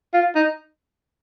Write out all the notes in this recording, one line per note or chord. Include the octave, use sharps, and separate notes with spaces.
F4
D#4